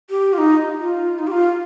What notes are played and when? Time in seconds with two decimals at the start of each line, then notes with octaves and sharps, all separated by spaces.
0.10 G4
0.33 F4
0.38 D#4
0.80 F4
1.19 D#4
1.27 G4
1.32 F4